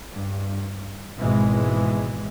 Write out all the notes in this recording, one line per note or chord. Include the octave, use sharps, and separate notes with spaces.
G2
G#1 B2 E3 G#3